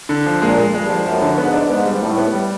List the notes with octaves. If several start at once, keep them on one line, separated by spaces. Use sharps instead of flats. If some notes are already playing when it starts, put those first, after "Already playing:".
D3
F3
A#2 G#3
G#3
G2 G#3
F3
F#2 F3
D3
G#2 B3
D4
G#2 B3
G3
A2 G3
B3
G3